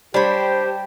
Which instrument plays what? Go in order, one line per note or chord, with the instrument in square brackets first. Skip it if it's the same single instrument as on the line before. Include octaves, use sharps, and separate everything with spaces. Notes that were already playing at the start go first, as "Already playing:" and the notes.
[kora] G3 C#5 [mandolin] D4 B5 [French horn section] G4 [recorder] C5